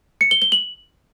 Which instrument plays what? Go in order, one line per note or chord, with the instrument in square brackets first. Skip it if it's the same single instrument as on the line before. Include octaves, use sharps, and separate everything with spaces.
[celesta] C#7
G7
G7
F#7